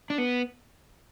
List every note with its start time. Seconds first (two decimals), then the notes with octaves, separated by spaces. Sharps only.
0.10 D4
0.18 B3